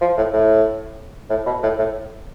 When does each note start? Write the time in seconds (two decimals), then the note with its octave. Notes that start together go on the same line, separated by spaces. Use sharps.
0.01 F3
0.17 A2
0.33 A2
1.30 A2
1.46 B2
1.63 A2
1.78 A2